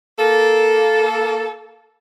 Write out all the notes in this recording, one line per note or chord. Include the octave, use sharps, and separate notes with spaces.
A#3 A4